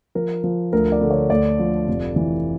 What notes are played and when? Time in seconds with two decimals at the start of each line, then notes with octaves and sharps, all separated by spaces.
0.15 F3 A#4
0.44 F3
0.73 D2 A#4
0.92 D5
1.01 D3
1.11 C#5
1.30 D2 D5
1.59 F3
1.88 F1
2.16 E3